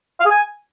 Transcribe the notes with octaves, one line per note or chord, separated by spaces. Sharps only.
F5
G#4
G#5